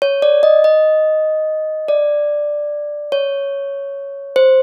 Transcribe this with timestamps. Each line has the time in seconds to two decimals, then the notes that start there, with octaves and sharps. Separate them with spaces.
0.02 C#5
0.22 D5
0.43 D#5
0.64 D#5
1.88 D5
3.12 C#5
4.36 C5